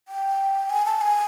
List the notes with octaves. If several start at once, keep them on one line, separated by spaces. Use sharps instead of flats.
G5
G#5
A5
G#5